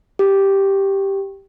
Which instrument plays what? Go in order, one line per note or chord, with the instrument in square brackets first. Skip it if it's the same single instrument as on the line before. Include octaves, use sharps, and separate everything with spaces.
[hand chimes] G4